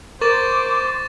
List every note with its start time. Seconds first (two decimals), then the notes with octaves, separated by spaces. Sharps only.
0.21 A#4 C5 C#6 D6 A6 E7